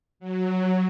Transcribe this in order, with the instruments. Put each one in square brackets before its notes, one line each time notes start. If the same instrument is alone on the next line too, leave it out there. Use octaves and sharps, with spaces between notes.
[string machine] F#3